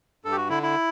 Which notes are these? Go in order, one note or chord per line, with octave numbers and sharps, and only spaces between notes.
G2 A4
G4
F#4
D3 E4
E4